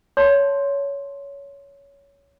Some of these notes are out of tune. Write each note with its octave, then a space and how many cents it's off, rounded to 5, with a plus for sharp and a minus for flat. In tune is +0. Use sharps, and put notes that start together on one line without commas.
C#5 +15 A5 +0 C6 +0